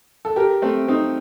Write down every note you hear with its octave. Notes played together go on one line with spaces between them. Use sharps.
A4
G4 A#4
A3 C4
C4 D#4